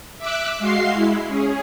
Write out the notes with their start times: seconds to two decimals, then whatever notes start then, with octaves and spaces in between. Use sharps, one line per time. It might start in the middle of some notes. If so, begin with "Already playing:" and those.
0.18 E5 D6 E6 F#6
0.59 G#3 F#4 F5 C6 C7
0.93 G#3 E4
1.28 C#4 G#4